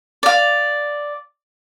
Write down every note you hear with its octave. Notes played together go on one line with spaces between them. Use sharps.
D5 F5